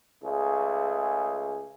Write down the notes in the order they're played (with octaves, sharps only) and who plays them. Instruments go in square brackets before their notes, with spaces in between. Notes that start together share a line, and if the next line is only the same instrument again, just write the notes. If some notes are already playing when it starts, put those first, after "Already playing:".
[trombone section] C#2 A3 G#4